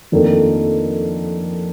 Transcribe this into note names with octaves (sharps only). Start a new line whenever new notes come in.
F2 D#3 A#3 D4 A4